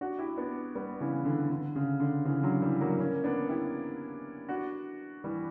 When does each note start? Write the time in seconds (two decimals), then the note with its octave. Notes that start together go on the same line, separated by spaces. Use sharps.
0.01 D4 F#4
0.19 E4 G4
0.37 B3 D4
0.75 G3 B3
1.00 C#3 E3
1.25 D3
1.50 D3
1.76 C#3
2.00 D3
2.25 C#3 E3
2.43 D3 F#3
2.62 E3 G3
2.80 F#3 A#3
2.99 A#3 C#4
3.24 B3 D4
3.49 E4 G4
4.49 D4 F#4
5.24 E3 G3